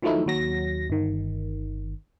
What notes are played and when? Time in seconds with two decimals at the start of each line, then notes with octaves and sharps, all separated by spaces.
0.02 D#3 F3 F#3 A3 D#4 E4
0.26 D#2 F#3 A#6
0.90 G1 D#3